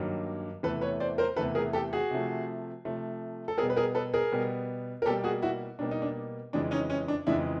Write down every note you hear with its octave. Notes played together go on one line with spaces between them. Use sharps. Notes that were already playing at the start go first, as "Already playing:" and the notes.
Already playing: G2 D#3 F#3 A#3
E2 C3 E3 A3 A4 B4
B4 C#5
C5 D5
A#4 C5
E2 C3 E3 A3 A4 B4
G#4 A#4
G4 A4
F#4 G#4
C3 F3 A3
C3 F3 A3
A4
B2 G3 B3 G#4 A#4
B4
G#4 A#4
A4 B4
G#4 A#4
B2 G3 B3
A#4
B2 G3 A#3 G4 A4
F#4 G#4
E4 F#4
B2 G3 A#3 D4
D#4
D4
F2 C#3 E3 G#3 D4
C#4 D#4
C#4
D4
F2 C#3 E3 G#3 D4 E4